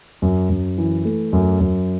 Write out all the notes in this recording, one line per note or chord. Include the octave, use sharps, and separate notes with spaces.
F#2
F#2
E3
A3
F#2
F#2